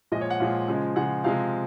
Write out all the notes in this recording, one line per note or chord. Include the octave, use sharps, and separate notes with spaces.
A#2 F3 G#3 D#5
C#5
F#5
A#2 F3 G#3 F5
C#3 F3 G#3
C#3 F3 G#3 F#5
C3 F3 G#3 F5